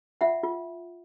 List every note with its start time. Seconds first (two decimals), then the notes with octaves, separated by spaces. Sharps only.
0.21 F4 E5 F#5
0.43 F4